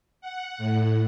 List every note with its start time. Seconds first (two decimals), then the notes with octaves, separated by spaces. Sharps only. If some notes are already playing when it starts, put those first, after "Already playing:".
0.21 F#5
0.58 A2